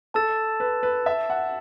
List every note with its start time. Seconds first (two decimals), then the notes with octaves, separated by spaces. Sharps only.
0.14 A4 A5 E6 A6 E7
0.60 B4
0.83 B4
1.06 E5
1.30 F#5